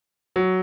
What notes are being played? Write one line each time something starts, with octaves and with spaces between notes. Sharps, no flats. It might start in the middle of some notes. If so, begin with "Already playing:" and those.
F#3